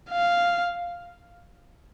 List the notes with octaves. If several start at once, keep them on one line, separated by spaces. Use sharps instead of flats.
F5